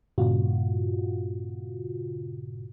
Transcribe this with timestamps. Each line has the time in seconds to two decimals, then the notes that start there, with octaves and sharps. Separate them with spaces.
0.18 G2 A#2 C#3 F4 F#4